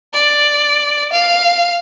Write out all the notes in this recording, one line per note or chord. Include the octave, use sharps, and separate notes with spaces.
D5
F5